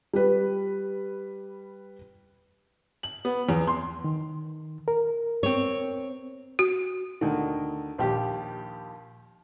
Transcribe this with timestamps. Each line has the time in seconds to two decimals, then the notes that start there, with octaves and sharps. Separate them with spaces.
0.13 G3 B4
3.03 F#7
3.25 B3
3.49 E2
3.68 C6
4.04 D#3
4.88 A#4
5.43 C4 C#5
6.59 F#4
7.21 D2 D#3
7.98 A#1 D#2 G4